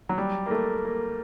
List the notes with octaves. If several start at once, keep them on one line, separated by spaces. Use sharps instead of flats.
F#3
G3
A#3
A3
A#3